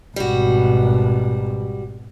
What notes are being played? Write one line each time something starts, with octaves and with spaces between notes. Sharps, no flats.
G#1 B2 G3 F#4